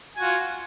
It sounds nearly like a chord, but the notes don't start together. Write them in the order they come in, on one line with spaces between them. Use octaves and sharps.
G#5 F#4 F4